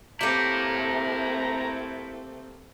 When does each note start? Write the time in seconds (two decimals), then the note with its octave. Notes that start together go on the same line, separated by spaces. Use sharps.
0.21 A3 A#3 C4 E4 G4 A4 A#5